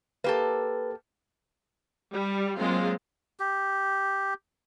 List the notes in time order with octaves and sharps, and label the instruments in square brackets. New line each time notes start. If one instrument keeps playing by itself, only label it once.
[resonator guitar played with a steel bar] A#3 G4 A4 [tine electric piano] B4
[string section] G3
F#3 G#3 A#3 C4 F4
[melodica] G4